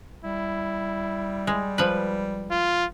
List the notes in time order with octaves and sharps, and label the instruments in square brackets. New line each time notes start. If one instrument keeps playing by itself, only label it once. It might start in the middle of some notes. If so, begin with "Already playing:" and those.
[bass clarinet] G3 [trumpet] E4
[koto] G#3
F3 B4
[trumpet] F4